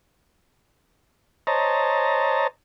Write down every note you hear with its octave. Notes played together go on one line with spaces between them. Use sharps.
C5 C#5 D#5 A5 A#5